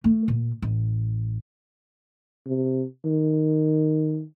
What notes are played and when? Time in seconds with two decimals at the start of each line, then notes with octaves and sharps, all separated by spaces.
0.04 A3
0.28 A#2
0.62 A1
2.46 C3
3.05 D#3